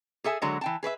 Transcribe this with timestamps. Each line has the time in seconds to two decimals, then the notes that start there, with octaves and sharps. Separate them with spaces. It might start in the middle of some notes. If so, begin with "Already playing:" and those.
0.24 G#4 A4 E5 G#5
0.42 D3 F#3 G#3 F#4 C#5
0.61 E3 G5 A5
0.83 G#4 B4 C#5 E5